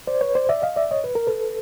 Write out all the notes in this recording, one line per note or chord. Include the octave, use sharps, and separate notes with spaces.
C5 D5
B4 C#5
C5 D5
D5 E5
D#5 F5
D5 E5
C#5 D#5
B4
A#4
A4 B4